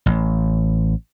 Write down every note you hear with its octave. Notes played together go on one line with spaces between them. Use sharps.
A1